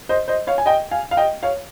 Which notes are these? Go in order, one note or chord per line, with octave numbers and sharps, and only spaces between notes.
C5 D#5
C5 D#5
C#5 F5
G#5
D#5 G5
F5 G#5
F5
D#5 G5
C#5 F5